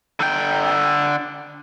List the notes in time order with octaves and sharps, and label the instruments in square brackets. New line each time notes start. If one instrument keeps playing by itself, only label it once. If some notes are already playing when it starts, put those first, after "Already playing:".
[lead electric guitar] D3 G5